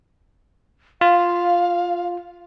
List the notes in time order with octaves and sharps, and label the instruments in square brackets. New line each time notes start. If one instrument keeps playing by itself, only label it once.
[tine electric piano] F4 [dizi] F5